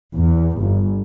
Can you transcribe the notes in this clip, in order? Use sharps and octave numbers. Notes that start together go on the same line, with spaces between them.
E2
G1